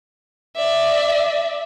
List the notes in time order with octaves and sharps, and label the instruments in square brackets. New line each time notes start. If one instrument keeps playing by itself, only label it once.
[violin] D5 E5